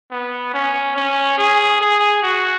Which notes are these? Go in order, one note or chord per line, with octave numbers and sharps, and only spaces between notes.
B3
C#4
C#4
G#4
G#4
F#4